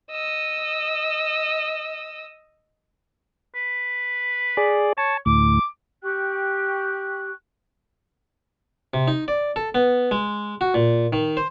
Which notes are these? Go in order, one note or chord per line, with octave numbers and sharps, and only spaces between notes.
D#5 E6
B4
G#4 D5
C#5 A5
D2 A2 D6
G4 G5 C#6 F#6
C3
D#4
D5
A4
B3
G#3
F#4
A#2
D#3
C5